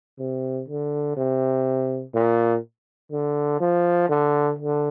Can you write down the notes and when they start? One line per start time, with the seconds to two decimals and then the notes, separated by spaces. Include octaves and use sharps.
0.19 C3
0.68 D3
1.17 C3
2.14 A#2
3.12 D3
3.60 F3
4.09 D3
4.58 D3